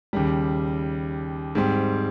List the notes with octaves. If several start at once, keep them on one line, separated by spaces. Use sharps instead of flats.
D#2 C#3 G3
G#2 G3 C4